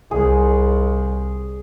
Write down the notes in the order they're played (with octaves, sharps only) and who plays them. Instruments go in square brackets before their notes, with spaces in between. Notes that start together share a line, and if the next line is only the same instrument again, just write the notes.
[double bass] C2 [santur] G#4